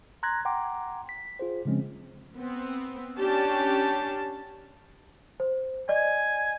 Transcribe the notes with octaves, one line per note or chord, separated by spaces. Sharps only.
A#5 C6 F#6 G#6 A#6
F#5 G5 A#5 C6 D6
B6
F4 G#4 C5
C#3 F3 G#3 C4 C#4
B3 C4
C#4 D4 G4 A5
C5
D5 D#5 G#5